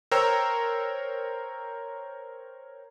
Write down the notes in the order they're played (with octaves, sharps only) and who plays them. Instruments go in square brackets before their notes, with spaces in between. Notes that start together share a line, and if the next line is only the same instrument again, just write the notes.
[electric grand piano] A#4 C5 C#5 G5 A#5 E6